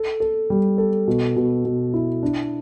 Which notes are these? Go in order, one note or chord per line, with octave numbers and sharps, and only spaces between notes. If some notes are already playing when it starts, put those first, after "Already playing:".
Already playing: A4
A4
G3
A4
B2
B2
B2
E4
D4